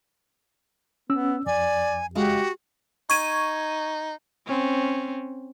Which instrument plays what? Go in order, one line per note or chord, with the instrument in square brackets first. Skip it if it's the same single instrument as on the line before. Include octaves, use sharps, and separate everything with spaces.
[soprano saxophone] B3 [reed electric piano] C#4 E6
[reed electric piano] F2 [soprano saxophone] D5 [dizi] G#5
[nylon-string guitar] C#3 G#3 F5 [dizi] F#4 [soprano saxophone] G4
[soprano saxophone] D#4 [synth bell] C#6 G#6 D#7
[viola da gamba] C4 C#4